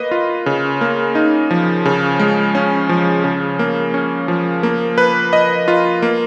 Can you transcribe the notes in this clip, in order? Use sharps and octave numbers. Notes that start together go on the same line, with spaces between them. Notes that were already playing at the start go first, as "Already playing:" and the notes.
Already playing: A#3 B4 D#5
F4
C#3
A#3
D#4
F3
C#3
G#3
C#4
F3
C#3
A#3
C#4
F3
A#3
B4
D#5
F4
A#3